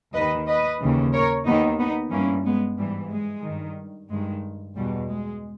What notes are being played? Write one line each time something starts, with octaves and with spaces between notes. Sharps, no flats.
D#2 D#3 B4 D#5
B4 D#5
D#2 C#3 E3
A#4 C#5
D#2 D#3 B3 D#4
B3 D#4
G2 E3 A#3 C#4
G#3 B3
G#2 E3 G3
G#3
G2 D#3
G2 D#3 G#3
E2 B2 G3
G#3